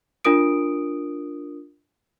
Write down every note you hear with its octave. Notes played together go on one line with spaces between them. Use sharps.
D4 F4 A#4 D#6 D7